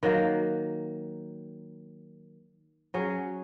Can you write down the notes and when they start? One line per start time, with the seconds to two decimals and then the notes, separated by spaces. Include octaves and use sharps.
0.03 D#3 F#3 A#3
2.94 F#3 C#4 G#4